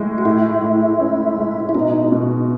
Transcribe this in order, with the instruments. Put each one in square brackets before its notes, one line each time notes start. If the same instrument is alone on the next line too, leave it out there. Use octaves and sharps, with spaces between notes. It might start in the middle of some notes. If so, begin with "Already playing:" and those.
Already playing: [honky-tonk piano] A2 G#3
[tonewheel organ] F#4
[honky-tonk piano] A2 [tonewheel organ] E4
[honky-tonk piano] A2
C#4
G#3
[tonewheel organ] E4
[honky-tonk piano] B2 [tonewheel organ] D#4
[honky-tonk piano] B2